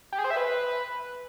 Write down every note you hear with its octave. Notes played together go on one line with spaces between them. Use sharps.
G4
G#4
C5
E5
B4